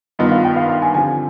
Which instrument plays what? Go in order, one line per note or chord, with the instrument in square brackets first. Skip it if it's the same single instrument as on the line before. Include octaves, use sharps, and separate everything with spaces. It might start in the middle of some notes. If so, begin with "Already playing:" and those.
[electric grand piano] G2 D#3 B3 F4 [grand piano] D#5
[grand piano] F5
G5
F5
F5
G#5
[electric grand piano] D3 F3 C4 G4 [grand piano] G#5